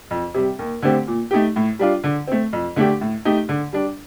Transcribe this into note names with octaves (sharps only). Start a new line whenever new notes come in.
F2
C3 G3
D#2
D3 A3 C4 G4
A#2
A3 D#4 G4
A2
G3 D4 F4
D3
A3 C4
F2
D3 A3 D4 G4
A2
A3 D#4 G4
D3
G3 D4